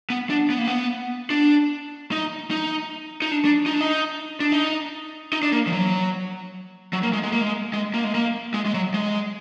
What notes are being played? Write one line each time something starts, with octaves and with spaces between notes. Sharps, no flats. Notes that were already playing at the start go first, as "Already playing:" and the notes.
B3
D4
B3
A#3
B3
D4
D#4
D#4
D#4
D4
D4
D#4
D4
D#4
D4
D#4
D#4
D4
A#3
F3
F#3
F#3
A#3
G#3
G#3
A#3
G#3
G#3
A#3
G#3
A#3
G#3
G#3
F#3
G#3